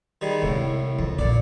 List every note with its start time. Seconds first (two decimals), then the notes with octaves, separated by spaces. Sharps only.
0.21 D#3 G3 G#3
0.42 C2 A2 G#3 D4
0.99 F2 D#3
1.19 A#1 A#2 D5